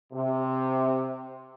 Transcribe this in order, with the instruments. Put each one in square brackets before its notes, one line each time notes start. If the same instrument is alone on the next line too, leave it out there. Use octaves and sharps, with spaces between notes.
[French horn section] C3